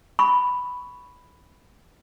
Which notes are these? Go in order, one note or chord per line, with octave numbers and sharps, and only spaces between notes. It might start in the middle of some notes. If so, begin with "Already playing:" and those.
B5 C#6